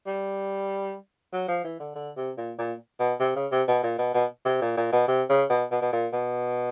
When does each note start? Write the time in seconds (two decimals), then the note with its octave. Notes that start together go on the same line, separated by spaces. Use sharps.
0.07 G3
1.33 F#3
1.49 F3
1.65 E3
1.80 D3
1.96 D3
2.17 C3
2.38 A#2
2.59 A#2
3.00 B2
3.20 C3
3.36 C#3
3.52 C3
3.68 B2
3.83 A#2
3.98 B2
4.14 B2
4.46 C3
4.62 A#2
4.77 A#2
4.93 B2
5.08 C3
5.30 C#3
5.50 B2
5.72 B2
5.82 B2
5.93 A#2
6.13 B2